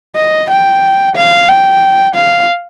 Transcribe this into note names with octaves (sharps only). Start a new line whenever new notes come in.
D#5
G5
F5
G5
F5